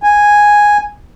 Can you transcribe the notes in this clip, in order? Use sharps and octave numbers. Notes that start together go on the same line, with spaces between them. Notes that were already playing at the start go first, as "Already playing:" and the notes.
G#5